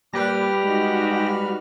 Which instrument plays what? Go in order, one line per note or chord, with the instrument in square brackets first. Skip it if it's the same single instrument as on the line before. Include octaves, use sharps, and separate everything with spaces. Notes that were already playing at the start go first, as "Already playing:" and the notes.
[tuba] A#2 [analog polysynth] G3 B4 F6 [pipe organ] G4 A#6
[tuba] G#3 [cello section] D#4 F#4